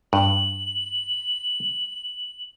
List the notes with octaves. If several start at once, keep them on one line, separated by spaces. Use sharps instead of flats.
G2 F#7